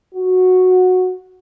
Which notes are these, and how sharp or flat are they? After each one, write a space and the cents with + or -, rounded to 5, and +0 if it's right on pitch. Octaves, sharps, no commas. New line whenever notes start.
F#4 -10